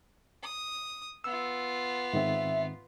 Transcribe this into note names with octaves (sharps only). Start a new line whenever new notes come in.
D#6
B3 F4 E6
G#2 D#3 C4 E5